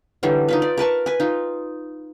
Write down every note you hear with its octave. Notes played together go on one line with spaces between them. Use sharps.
D3 E3 F#3 G3
D#4 F4 B4
D5
A#4 B4 A5 C#6
B4 G#5
D#4 F4